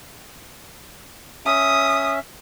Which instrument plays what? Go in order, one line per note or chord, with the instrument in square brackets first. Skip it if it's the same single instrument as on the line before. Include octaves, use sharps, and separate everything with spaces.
[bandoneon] C#4 E5 [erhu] D#6